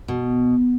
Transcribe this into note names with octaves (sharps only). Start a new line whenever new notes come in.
B2